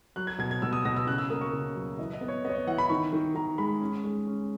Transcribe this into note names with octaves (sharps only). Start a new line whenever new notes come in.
F#3 F#6
G#6
B2 G#6
G#6
B2 E6
D#6
B2 A#6
E6
C#3 F#6
E6
A#3 D#6
C#6
C#3
F#3
E3 D#5
D#5
B3
C#5
B3 C#5 D#5
D#5
E3 F#5
B5
D#3 C#6
D#3
D#3 A#5
G#3 B5
C#4
G#3
C#4